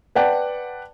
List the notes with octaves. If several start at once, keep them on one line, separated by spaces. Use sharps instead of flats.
B4 D5 F#5 G5 A5